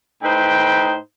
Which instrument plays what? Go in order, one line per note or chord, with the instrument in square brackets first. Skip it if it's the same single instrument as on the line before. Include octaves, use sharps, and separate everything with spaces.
[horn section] A2 D#4 B4 C5 G5